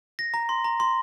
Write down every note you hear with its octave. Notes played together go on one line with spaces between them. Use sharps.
A#6
A#5
C6
A#5
C6